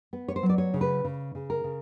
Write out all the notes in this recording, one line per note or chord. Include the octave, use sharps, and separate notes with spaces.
B3
C#5
C5
F#3
D5
C#5
C#3
B4
C#3
C#3
A#4
C#3